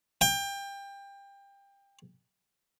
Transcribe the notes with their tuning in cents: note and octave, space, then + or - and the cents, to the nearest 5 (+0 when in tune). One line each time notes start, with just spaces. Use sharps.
G5 +25